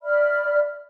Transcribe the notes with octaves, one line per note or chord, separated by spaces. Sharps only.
D5 E5 B5 F6